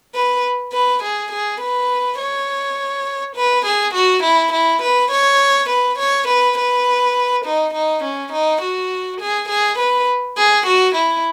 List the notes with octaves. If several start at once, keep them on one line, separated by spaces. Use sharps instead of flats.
B4
B4
G#4
G#4
B4
C#5
B4
G#4
F#4
E4
E4
B4
C#5
B4
C#5
B4
B4
D#4
D#4
C#4
D#4
F#4
G#4
G#4
B4
G#4
F#4
E4